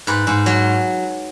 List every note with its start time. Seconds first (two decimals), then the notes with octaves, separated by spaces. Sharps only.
0.07 G#2 B4
0.27 G#2
0.46 F#3